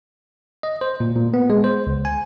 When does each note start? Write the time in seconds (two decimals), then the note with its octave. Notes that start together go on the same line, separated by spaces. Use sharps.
0.63 D#5
0.81 C5
1.00 A#2
1.16 A#2
1.34 B3
1.50 G#3
1.64 C5
1.87 C#2
2.05 G#5